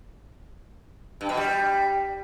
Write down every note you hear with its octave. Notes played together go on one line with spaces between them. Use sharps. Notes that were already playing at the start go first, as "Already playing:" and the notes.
G2
B2
G3